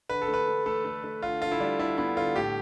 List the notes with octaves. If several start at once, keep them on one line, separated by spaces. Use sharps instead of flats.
D3 B4
A4
A3
B4
A3
A3 A4
A3
A3
D3 F4
D3 F4
E4
G3 D4
D3 E4
B3 E4
D3 F4
A2 G4